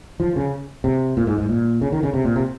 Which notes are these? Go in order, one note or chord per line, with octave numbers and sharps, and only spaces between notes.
F3
C#3
C3
A#2
G#2
G#2
A#2
C#3
D#3
C#3
C3
A#2
C3